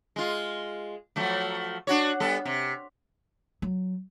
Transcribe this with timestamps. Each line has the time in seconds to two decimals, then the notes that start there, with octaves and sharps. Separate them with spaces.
0.16 G#3 F4
1.16 F3 F#3 A3
1.87 D4 F#4 C#5
2.20 G3 B3 A4
2.45 C3
3.62 F#3